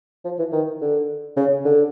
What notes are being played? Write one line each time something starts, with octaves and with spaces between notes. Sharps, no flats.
F3
E3
D#3
D3
C#3
D3